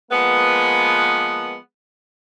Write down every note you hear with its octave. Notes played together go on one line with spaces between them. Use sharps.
F3 G#3 A#3 B3